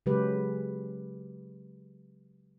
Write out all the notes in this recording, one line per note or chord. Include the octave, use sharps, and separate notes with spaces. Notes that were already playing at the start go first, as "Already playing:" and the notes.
C#3 F#3 G#3 G4 B4